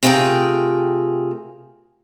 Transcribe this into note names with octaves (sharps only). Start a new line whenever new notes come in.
C3 A3 F4 G#4 A#4 G5